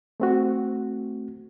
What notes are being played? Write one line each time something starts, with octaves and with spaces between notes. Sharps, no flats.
A3 C4 F#4